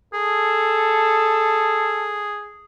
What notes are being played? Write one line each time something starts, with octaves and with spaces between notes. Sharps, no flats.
G#4 A4